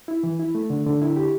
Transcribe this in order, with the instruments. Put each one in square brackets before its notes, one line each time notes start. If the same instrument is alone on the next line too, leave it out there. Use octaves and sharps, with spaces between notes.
[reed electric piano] E4
E3
E4
A3
D3
D3
E4
G4